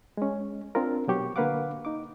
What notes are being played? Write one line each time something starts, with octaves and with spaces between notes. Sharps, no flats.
G#3 C#4
C4 D4 F4 A#4
B2 F#3 G4 C#6
D3 A#3 B4 F5 F#5 D6
D#4 D6